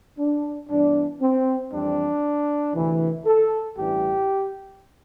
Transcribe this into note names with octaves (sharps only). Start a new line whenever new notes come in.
D4
G2 E3 B3 D4
C4
F2 E3 G3 C4 D4
D2 C3 E3
A4
A1 G2 E3 G3 G4